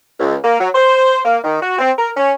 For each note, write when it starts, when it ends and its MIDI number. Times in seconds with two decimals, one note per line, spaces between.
0.20 0.36 37
0.43 0.59 58
0.59 0.69 54
0.75 1.20 72
1.25 1.38 58
1.44 1.59 51
1.62 1.76 66
1.79 1.91 60
1.98 2.10 70
2.17 2.33 61